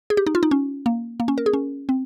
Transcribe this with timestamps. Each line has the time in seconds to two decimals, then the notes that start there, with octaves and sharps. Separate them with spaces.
0.10 G#4
0.17 G4
0.27 D#4
0.35 F4
0.43 D#4
0.51 C#4
0.86 A#3
1.20 A#3
1.28 C#4
1.38 A#4
1.46 G#4
1.53 C#4
1.89 C4